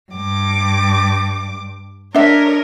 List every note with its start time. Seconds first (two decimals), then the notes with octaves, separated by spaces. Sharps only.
0.12 G2 D6
2.14 D4 A#4 C#5 D#5 E5